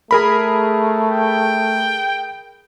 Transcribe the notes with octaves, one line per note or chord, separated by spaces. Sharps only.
A3 G#4 A#4 B5
G5